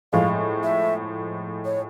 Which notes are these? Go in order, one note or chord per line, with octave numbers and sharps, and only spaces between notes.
A2 F3 G#3 F5
E5
C#5